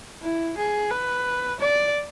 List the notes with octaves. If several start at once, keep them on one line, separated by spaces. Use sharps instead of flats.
E4
G#4
B4
D5